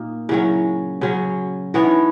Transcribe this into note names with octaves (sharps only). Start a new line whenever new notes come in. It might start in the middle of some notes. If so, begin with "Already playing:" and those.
Already playing: A#2 A#3 D#4
C#3 F#3 C#4 E4
C#3 F#3 C#4 F#4
E3 B3 E4 F#4 C#5
D#4
E4